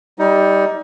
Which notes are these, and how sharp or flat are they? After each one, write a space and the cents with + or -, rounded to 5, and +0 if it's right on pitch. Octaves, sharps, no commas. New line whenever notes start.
G3 +0 D#4 +25